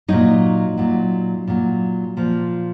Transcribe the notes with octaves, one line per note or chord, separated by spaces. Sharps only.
A#2 F#3 D#4
A#2 F#3
A#2 F#3
A#2 F3